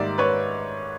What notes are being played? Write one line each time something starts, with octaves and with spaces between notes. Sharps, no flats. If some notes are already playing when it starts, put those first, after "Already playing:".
Already playing: G#2 D#3 G3 A#3 D5 E5
B4 C#5